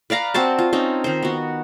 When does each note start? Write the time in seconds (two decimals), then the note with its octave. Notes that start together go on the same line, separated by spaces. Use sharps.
0.10 B4 D5 F5 A#5
0.34 C4 F#4 C5 A5
0.59 F4
0.73 C4 C#4 D#4
1.04 D#3 C5
1.23 B3 F#4